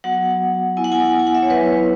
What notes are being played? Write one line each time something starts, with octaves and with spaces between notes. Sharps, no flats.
F#3 B3 F#4 F#5
B3 E4 G#5
F#5
G#5
G#5
F#5
E5
C#5
F#3 B3 E4 B4